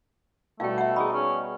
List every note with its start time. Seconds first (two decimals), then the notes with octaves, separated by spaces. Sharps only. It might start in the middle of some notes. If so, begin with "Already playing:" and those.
0.60 B2 G3 A3 F5 G5 A5
0.78 E5 F#5
0.96 D#4 G#4 B5
1.13 C#4